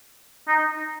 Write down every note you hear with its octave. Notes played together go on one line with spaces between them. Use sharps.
D#4